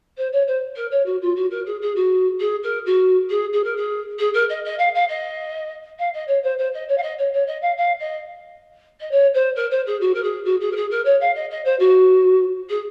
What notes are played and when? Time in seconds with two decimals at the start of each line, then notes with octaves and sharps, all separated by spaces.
0.17 C5
0.32 C#5
0.47 C5
0.76 A#4
0.91 C#5
1.05 F#4
1.21 F4
1.35 F#4
1.50 A#4
1.66 G#4
1.81 G#4
1.95 F#4
2.40 G#4
2.63 A#4
2.85 F#4
3.29 G#4
3.52 G#4
3.64 A#4
3.76 G#4
4.19 G#4
4.33 A#4
4.49 D#5
4.64 D#5
4.78 F5
4.94 F5
5.08 D#5
5.99 F5
6.13 D#5
6.27 C#5
6.43 C5
6.58 C5
6.73 D#5
6.88 C#5
6.97 F5
7.02 D#5
7.18 C#5
7.33 C#5
7.47 D#5
7.61 F5
7.77 F5
7.99 D#5
9.00 D#5
9.11 C#5
9.34 C5
9.55 A#4
9.70 C5
9.86 G#4
10.00 F#4
10.14 A#4
10.23 G#4
10.45 F#4
10.60 G#4
10.71 A#4
10.75 G#4
10.90 A#4
11.05 C#5
11.20 F5
11.35 D#5
11.50 D#5
11.64 C5
11.79 F#4
12.69 G#4